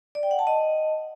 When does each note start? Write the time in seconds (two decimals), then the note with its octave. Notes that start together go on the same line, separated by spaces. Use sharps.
0.15 D5
0.23 G5
0.31 F#5
0.39 A5
0.47 D#5